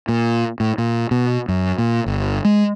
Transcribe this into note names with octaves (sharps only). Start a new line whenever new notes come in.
A#2
A2
A#2
B2
F#2
A#2
G1
G#3